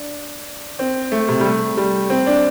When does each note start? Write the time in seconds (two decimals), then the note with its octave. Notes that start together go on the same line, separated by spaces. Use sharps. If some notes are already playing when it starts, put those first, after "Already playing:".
Already playing: D4
0.79 C4
1.12 A3
1.29 C3
1.40 G3
1.44 A3
1.77 G3
2.10 C4
2.26 D4